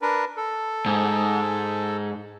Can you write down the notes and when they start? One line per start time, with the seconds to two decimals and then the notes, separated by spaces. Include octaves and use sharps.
0.02 D4 A#4 B4
0.37 A4
0.86 G#2